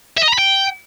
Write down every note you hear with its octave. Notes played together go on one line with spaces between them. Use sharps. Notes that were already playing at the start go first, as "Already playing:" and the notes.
E5
D#5
A#5
B5
G5